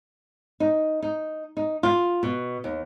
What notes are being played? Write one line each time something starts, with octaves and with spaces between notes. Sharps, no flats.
D#4
D#4
D#4
F4
B2
D#2